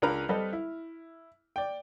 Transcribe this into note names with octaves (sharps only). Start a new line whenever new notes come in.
C#2 D4 A#4 B4 A#5 F6
G3 C4 A4 B4 D#5
E4
D5 G5